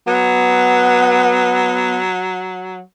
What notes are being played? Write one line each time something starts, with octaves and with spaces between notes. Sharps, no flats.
F#3 B3